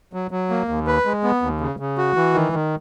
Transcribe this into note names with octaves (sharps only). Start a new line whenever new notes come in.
F#3
F#3
A#3
D#2
B4
G#3
B3
D#2
C#3
C#3
F#4
E3
D#3
D#3